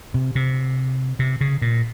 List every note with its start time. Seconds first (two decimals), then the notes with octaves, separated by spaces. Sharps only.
0.14 C3
0.35 C3
1.19 C3
1.41 C#3
1.62 A#2